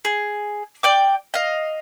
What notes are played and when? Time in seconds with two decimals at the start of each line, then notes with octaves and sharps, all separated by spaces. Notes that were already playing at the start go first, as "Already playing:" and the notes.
0.05 G#4
0.83 D5 G5 D6
1.34 D#5 F5